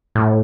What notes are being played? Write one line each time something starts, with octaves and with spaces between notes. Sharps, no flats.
A2